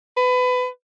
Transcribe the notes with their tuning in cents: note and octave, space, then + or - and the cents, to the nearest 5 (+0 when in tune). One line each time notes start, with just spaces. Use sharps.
B4 +25